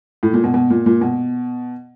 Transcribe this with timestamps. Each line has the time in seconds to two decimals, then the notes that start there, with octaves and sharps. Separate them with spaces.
0.23 A2
0.34 A#2
0.44 B2
0.54 B2
0.70 A#2
0.86 A#2
1.01 B2